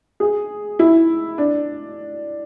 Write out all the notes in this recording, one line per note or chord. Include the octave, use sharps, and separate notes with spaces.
G#4
E4
D4